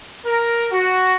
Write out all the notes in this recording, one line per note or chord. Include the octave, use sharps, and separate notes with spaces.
A#4
F#4